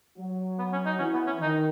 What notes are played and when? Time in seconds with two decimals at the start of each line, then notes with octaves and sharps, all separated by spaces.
0.17 F#3
0.59 B3
0.72 C#4
0.86 D#4
0.99 E3 C#4
1.13 B3
1.27 C#4
1.41 D#3 D#4